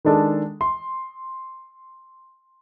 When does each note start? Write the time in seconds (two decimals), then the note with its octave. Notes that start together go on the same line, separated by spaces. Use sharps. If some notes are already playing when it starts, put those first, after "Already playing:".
0.05 D#3 G#3 D4 A4
0.61 C6